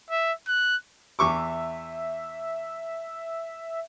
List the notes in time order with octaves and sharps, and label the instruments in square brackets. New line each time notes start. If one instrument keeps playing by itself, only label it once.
[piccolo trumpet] E5
F#6
[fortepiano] E2 C#6 D6 [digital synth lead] E5